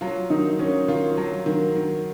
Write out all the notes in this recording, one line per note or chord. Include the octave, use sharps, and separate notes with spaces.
F#3 F4
D#3 D#4
D#3 C#4
D#3 F4
F#3
D#3
D#3